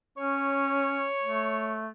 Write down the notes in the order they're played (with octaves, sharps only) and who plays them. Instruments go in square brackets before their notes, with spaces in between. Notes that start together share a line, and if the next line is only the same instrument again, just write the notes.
[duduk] C#4 [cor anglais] C#5
[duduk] A3